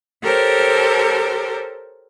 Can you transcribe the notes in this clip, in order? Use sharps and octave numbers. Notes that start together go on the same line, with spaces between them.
G4 A4 A#4 C5 C#5